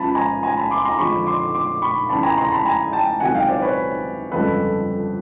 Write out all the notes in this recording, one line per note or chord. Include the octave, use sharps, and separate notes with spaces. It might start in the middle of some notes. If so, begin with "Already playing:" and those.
Already playing: C#2 C#3 F3 A5 B5
G#5 A#5
G#5 A#5
A5 B5
C6 D6
A#5 C6
F2 D3 F3 G#3 B5 C#6
C6 D6
C6 D6
B5 C#6
F1 E2 C#3 A5 B5
G#5 A#5
A#5 C6
A5 B5
G#5 A#5
G5 A5
C#2 C3 D#3 F#3 F#5 G#5
F5 G5
C5 D5
B4 C#5
G1 F2 C#3 F3 G#3 A4 B4